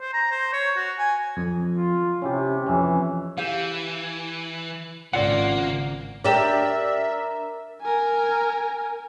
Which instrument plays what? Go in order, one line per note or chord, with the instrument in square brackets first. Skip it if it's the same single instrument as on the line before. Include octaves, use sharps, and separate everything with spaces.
[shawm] C5
A#5
C5
C#5
F#4
G#5
[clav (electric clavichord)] F2
[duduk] F4
[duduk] C3 [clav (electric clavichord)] C#4 E4 G4
[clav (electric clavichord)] F2 C#4 [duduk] E3
[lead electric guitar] E3 [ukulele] G4 F5
[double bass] G#1 [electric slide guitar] C#3 F4 F#5 [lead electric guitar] A#3 [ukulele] E4 D5
[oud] D4 G4 [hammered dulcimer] A#4 [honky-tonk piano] D5 E7 [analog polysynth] E5
[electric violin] A#4 G#5